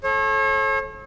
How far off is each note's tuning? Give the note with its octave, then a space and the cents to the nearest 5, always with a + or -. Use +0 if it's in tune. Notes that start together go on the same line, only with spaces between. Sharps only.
A4 -25 C#5 -40